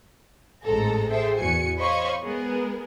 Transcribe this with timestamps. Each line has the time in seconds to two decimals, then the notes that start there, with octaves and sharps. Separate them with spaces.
0.64 A1 G#2 G#3 C4 A4 A#5
1.11 G#4 A4 C5 E5 G5
1.39 E2 F#4 G#5 C#7
1.80 C5 C#5 D#5 F5 B5 C#6
2.23 G#3 B3 G#4 A#4